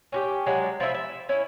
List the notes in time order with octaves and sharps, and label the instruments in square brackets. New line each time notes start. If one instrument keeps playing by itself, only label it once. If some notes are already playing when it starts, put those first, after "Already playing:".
[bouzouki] C#4 F#4 G4
F#3 G#3 D4
F3 E4 E5
E5
C#4 E4